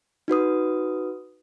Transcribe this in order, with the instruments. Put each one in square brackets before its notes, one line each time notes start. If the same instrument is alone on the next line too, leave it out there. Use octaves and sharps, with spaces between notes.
[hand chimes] D#4 F#4 B4 D#6